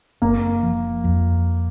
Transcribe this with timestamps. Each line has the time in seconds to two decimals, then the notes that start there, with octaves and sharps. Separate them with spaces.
0.22 F#1 A#3
0.63 F3
1.04 F2